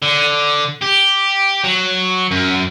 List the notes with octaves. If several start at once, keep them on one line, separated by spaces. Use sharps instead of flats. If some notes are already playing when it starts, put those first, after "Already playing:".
D3
G4
F#3
F#2